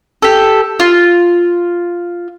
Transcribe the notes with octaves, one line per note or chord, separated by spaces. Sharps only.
G4 A4
F4